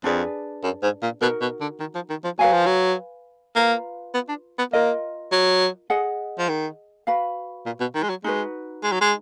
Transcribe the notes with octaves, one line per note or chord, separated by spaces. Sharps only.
F2 D4 G#4 B4 D5
F#2
G#2
A#2
B2 D#4 F#4 A#4
B2
D3
D#3
F3
D#3
F3
F#3 B4 F5 G#5
F3
F#3
A#3 F4 B4 F5 A#5
B3
D4
B3
A#3 F4 A#4 D#5
F#3
G#4 D#5 F#5
F3
D#3
F#4 B4 F5 B5
A#2
B2
D#3
G#3
F#3
G#3 D#4 F#4 B4
G#3
F#3
G#3